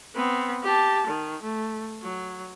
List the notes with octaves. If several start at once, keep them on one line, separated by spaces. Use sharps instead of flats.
B3 C4
G4 A5
D#3
A3
F#3